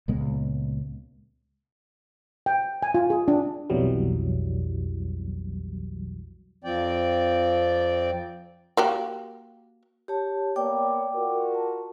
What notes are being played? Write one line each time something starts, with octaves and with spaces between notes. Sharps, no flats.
C#2 A#2 G#3 B3
G5
G#5
F4
G#4
D4
B1 F2 B2 E3 F#3 G3
F2 F3 C4 D5 G5
A#3 F#4 G4
G4 C#5 A5
A#3 B3 C#5 D5 G5 D6
F4 F#4 A#4
A5